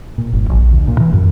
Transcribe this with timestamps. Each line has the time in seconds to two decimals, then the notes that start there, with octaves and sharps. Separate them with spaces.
0.18 A#2
0.33 G1
0.49 A#1
0.71 D2
0.87 A#2
1.00 E3
1.13 F#2